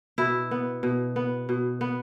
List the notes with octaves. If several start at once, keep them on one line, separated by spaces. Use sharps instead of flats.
B2 E4
B3
B2
B3
B2
B3